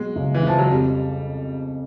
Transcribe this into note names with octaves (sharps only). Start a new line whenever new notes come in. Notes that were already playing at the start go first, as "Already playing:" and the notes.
Already playing: B2 F#3 G#3
C#2
E3
C#2 F3
F#3
F2 G3